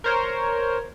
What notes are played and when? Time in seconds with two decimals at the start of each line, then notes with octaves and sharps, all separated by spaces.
0.04 A#4 C5 C#5